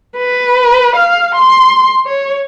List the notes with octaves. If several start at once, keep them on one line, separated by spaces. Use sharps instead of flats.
B4
F5
C6
C#5